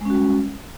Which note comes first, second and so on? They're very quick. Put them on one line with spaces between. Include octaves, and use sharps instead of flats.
G#3 C#4 F#4 G3